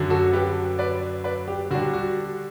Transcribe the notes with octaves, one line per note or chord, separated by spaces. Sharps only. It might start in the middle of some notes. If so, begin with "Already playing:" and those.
Already playing: F#2 D3 F#3
F#4 A4
G4 B4
B4 D5
B4 D5
G4
D3 G3 D4 F#4
F#4